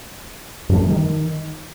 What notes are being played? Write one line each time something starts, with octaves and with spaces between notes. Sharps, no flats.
F#2
A3
F3
G3
D#3